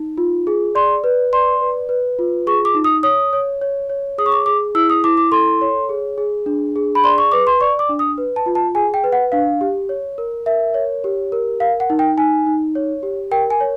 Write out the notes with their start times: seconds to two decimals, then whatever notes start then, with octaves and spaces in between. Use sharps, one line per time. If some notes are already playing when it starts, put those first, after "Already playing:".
Already playing: D#4
0.18 F4
0.47 G#4
0.75 D5 C6
1.04 B4
1.33 D5 C6
1.61 B4
1.89 B4
2.19 F4
2.47 G#4 C#6
2.65 D6
2.75 D#4
2.84 D#6
3.03 C#5 D#6
3.33 C#5
3.61 C#5
3.90 C#5
4.18 G#4 D#6
4.26 C#6
4.32 D6
4.46 G#4 D6
4.75 E4 E6
4.90 D#6
5.04 E4 D6
5.17 D6
5.32 A4 C6
5.61 C#5
5.89 G#4
6.18 G#4
6.46 D4
6.76 G#4
6.95 B5
7.04 D5 C6
7.18 C#6
7.32 B4 D6
7.47 C6
7.61 D5 C#6
7.79 D6
7.89 D4
7.99 D#6
8.18 B4
8.36 A5
8.46 F4
8.55 A5
8.75 G#4 G#5
8.94 G5
9.04 B4
9.12 F#5
9.32 D4 F5
9.61 G4
9.89 C#5
10.18 A#4
10.46 A#4 E5
10.74 C#5
11.04 G4
11.32 A#4
11.60 A#4 F5
11.80 F#5
11.90 D#4
11.99 G5
12.18 D#4 G#5
12.46 D#4
12.75 C#5
13.03 G4
13.31 A#4 G5
13.50 G#5
13.60 C#5